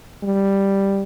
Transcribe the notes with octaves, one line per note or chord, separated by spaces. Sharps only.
G3